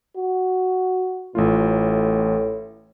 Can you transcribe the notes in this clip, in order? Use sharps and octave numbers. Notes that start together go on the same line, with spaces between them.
F#4
A1 A2 A3 F4